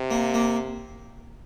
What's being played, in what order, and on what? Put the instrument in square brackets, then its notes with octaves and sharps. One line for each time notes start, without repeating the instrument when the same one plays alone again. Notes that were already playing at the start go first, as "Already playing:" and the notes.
Already playing: [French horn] C3
[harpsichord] A#3
A#3